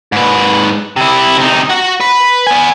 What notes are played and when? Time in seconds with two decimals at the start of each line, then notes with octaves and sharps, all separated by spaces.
0.12 G#2 B4
0.96 C3 E4
1.37 C3 D#4
1.70 F#4 F#5
2.00 B4
2.47 B3 G#5